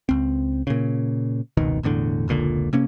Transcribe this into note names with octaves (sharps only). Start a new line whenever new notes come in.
C#2 C4
A#2 C#3
F1 C#2 B2 D#3
E1 E2 A2 D3
F1 C#2 A#2 D3
C3 A#3 C#4